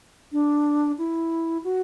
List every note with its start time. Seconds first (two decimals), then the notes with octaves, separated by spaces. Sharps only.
0.32 D4
0.98 E4
1.64 F#4